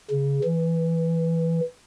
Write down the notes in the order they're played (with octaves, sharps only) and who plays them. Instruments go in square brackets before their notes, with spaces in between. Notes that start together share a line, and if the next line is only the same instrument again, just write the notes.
[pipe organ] C#3
E3